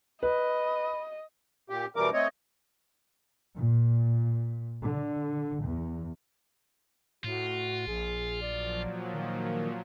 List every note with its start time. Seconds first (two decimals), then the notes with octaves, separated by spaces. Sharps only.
0.23 B4 D#5 B5
1.70 A#2 G4
1.96 B2 E3 G3 A#4 D6
2.13 A3 C4 C#5 D#5
3.57 A#2
4.83 D3
5.65 E2
7.24 A2 F4 F#4
7.87 A#1 G#4
8.42 A#2 F3 F#3 D5
9.14 D#3 A#3